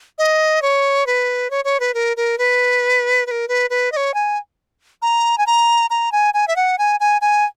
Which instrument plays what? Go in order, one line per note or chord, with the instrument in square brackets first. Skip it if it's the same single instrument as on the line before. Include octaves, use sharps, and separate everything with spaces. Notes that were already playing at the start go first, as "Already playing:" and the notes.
[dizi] D#5
C#5
B4
C#5
C#5
B4
A#4
A#4
B4
B4
A#4
B4
B4
D#5
C#5
G#5
A#5
G#5
A#5
A#5
G#5
G#5
E5
F#5
G#5
G#5
G#5